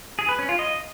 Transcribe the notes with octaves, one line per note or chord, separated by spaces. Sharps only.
G#4
B4
C#4
F4
D#5